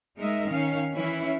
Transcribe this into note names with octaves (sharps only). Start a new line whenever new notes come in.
G#3 D#4 A#4 D#5 E5
D#3 C#4 F5
E3 C#4 E4